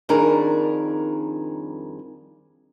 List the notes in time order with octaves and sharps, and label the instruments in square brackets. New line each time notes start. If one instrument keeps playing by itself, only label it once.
[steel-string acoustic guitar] F2 D#3 G3 D4 G#4 A#4